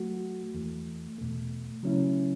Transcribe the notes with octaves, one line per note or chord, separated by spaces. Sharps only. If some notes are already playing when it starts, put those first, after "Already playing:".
Already playing: F#3 A3 F#4
E2 E3 A3
E2 B2 A3
C#3 F#3 A3 C#4 E4